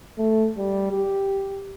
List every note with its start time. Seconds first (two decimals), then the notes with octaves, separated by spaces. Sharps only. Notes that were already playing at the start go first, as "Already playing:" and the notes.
0.18 A3
0.58 G3
0.92 G4